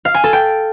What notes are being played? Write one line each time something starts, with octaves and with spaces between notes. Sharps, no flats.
F5
G#5
A4
G5